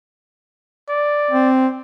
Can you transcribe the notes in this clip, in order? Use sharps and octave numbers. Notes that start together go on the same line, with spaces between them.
D5
C4